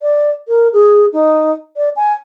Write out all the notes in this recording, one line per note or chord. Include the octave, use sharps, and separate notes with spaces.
D5
A#4
G#4
D#4
D5
G#5